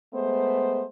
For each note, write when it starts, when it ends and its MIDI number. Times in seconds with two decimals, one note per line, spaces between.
0.14 0.83 56
0.14 0.83 57
0.14 0.83 59
0.14 0.83 72